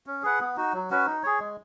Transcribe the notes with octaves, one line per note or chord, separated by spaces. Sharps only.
C#4
G#4 B4 F#5
B3
D#4 F#4
F#3
C#4 F#4 B4
D#4
G#4 C#5
G#3